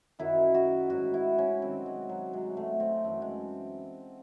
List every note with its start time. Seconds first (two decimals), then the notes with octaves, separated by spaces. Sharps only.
0.19 F#2 D#3 F#3 E4
0.54 F#4
0.90 G#2 F#3 F#4
1.14 E4
1.38 C#4
1.62 C3 D#3 F#3 C4
1.86 G#3
2.09 F#3
2.33 C3 F#3 G#3
2.57 A3
2.80 C4
3.04 F#2 E3 A3
3.22 G#3